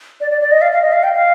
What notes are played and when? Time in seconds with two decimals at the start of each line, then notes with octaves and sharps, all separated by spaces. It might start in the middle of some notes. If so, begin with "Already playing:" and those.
0.21 D5
0.31 D5
0.41 D5
0.52 D#5
0.62 F5
0.72 F5
0.82 D#5
0.93 F5
1.03 G5
1.13 F5